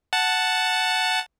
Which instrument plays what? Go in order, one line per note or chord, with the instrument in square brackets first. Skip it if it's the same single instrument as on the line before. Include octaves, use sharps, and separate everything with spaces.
[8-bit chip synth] F#5 A5